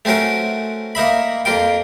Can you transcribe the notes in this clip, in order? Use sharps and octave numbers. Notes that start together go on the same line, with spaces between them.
A3 C4 C#4 F#4 A#4
A#3 D#4 E5 B5
F2 A#3 F4 G5